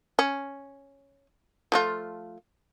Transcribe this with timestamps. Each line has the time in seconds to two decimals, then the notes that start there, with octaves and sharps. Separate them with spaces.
0.19 C#4
1.72 F3 A3 F4